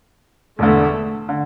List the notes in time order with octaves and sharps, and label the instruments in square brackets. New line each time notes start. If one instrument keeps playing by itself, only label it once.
[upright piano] E1 E2 D3 [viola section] A3
[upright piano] D3